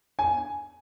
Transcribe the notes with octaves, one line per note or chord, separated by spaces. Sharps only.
G#5